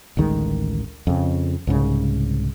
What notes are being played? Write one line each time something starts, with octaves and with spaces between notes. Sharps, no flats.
A1 D2 D#3 G#3
F2 C#3
C2 G#2 C#3